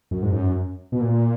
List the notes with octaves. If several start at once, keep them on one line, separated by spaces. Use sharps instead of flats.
F#2
G#2
F#2
B2
A#2